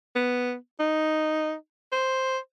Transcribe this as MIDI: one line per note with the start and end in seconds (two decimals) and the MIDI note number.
0.15 0.55 59
0.80 1.54 63
1.92 2.38 72